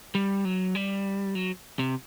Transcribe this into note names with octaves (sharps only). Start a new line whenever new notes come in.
G3
F#3
G3
F#3
C3